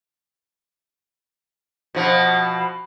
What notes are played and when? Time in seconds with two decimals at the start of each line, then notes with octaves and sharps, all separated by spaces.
1.95 B2 F3